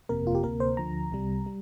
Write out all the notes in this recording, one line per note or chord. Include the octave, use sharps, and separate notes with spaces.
G1 F2 C3 A#3 A#4
F4
G4
D2 C3 A#3 A#4
C5
D2 D3 F3 A#5
C2 C3 G3
G3